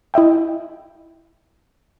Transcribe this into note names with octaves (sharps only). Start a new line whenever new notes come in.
E4 D#5 E5 G5